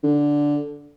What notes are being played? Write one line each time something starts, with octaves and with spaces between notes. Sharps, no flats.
D3